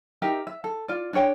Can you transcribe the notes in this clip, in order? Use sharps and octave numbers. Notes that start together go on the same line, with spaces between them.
D#4 G4 A#4 E5
E5
A4
F4 D5
D4 G#4 C#5 G5